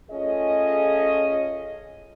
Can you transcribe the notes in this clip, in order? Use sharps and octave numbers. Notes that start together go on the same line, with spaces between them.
A3 C#4 F4 G#4 D#5